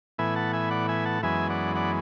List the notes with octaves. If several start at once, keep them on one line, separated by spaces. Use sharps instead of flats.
A2 E3 B3 E5 G#5
F#5 A5
E5 G#5
D5 F#5
E5 G#5
F#5 A5
F#2 E3 G#3 B3 E5 G#5
D5 F#5
D5 F#5